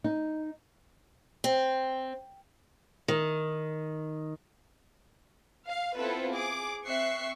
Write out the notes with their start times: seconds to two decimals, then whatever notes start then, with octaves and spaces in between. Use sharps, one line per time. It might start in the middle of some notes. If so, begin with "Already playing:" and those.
0.04 D#4
1.44 C4
3.08 D#3
5.67 F5
5.98 B3 C4 E4 F4 A4 B4
6.33 G#4 D6
6.86 C4 E5 C#6 F#6 C7